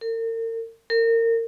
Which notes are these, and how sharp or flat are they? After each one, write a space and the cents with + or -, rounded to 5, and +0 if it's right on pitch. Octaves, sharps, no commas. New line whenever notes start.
A#4 -40
A#4 -30